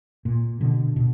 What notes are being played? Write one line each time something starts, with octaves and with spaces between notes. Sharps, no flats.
A#2
B2 D3
B2